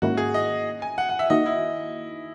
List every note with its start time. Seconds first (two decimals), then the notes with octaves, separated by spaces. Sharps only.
0.02 G#2 D#3 A#3 C#4 E4 F#4
0.17 G#4
0.34 D#5
0.82 G#5
0.98 F#5
1.09 F#5
1.19 E5
1.30 D#3 A#3 D#4 F#4 D#5
1.46 E4